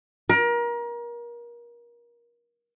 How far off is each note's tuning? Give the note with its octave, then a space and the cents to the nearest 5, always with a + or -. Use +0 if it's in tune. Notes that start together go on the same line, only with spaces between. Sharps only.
A#4 +30